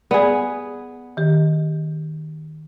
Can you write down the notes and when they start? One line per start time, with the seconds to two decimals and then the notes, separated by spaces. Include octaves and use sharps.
0.11 B3 G#4 D5
1.17 D#3 G4